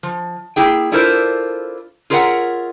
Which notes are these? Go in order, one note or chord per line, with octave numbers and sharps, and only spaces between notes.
F3
A#3 E4 G#4 G5
D4 E4 F4 A4 A#4 C5
F4 G#4 A#4 C#5 E5 F#5